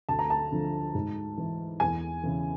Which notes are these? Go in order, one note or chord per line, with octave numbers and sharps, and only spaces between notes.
D2 A5
A#5
A5
D3 F3
G#2
E3
E2 G#5
C#3 E3